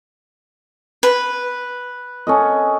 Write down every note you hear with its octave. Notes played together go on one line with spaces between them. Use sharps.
B4
C#4 A4 D#5